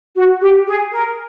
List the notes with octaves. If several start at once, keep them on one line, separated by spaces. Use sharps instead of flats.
F#4
G4
G#4
A#4